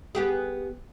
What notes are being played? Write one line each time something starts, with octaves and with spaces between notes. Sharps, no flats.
B3 G4 G#4